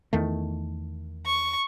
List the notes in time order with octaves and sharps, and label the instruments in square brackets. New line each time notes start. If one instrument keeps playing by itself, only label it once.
[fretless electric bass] E2 D#3 A3
[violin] C#6